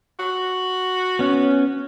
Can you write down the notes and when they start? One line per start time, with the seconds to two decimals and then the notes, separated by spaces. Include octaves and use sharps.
0.20 F#4
1.19 B3 C#4